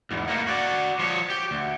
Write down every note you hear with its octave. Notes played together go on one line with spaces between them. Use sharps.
E2 G#2
A3 A#3
F#4 D5
F3 C#5
G4
D2